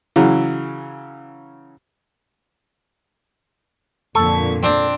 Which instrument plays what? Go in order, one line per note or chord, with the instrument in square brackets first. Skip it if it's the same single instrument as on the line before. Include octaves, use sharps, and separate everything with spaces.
[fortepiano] C#3 E3 F#3
[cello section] F2 A#2 D3 [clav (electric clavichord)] A4 [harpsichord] C#6
[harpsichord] C4 D4